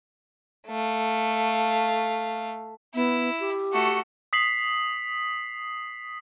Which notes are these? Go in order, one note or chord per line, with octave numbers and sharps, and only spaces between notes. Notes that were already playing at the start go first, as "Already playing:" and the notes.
A3 F5
B3 E4
G4
A3 F#4
D#6 B6 C7 F#7